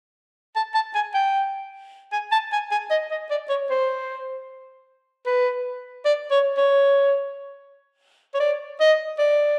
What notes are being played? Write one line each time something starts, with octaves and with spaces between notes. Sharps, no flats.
A5
A5
G#5
G5
G#5
A5
G#5
G#5
D#5
D#5
D5
C#5
C5
B4
D5
C#5
C#5
C#5
D5
D#5
D5